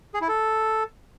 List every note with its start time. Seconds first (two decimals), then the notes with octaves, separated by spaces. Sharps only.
0.14 G#4
0.21 E4
0.28 A4